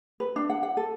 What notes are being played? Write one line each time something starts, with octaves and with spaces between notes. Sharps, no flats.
B4
D4
F#5
F#5
A4